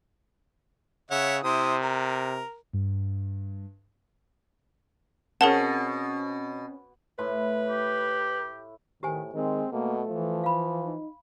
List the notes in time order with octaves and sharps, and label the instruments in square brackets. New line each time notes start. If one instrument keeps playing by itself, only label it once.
[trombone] C#3 [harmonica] C#5 E5 F#5
[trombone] C3 [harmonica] E4 C5 D#6
[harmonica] A#4
[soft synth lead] G2
[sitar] B2 [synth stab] C4 C#4 [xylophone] G#4 A#4 A5 [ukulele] F#5
[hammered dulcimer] A2 E4 C6 [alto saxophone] B4
[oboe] G4
[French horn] A2 [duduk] D#3 [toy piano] G4 C5 G#5
[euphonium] D#3 [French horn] G#3 [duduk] C4
[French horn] B2 [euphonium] A3 [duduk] A#3
[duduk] E3 [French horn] F3
[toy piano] F5 B5
[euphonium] D#4